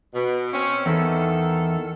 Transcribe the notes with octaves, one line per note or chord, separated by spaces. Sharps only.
B2
C4 C#4
E2 D#3 D#4 A4